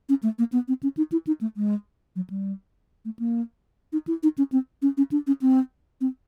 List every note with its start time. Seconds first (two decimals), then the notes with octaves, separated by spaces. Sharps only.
0.09 C#4
0.23 A3
0.39 A#3
0.52 B3
0.68 C4
0.83 C#4
0.97 D#4
1.12 E4
1.27 D#4
1.41 A3
1.57 G#3
2.16 F#3
2.30 G3
3.05 A3
3.19 A#3
3.93 D#4
4.07 E4
4.23 D#4
4.38 C#4
4.52 C4
4.82 C#4
4.97 C#4
5.12 D4
5.27 C#4
5.42 C4
6.01 C4